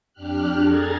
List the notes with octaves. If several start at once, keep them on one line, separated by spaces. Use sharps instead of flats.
F2 D4 G4 F6 F#6
G#4 A4 A#5 G#6 A6